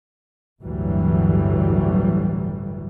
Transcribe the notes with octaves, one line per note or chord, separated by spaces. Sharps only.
G1 D2 A2 E3 F#3 G3